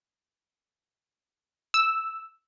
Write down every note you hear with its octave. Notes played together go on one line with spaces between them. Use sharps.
E6